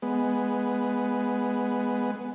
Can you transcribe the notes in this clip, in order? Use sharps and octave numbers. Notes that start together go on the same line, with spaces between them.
G#3 B3